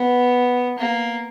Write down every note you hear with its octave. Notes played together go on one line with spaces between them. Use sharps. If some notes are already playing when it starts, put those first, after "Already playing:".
Already playing: B3
A#3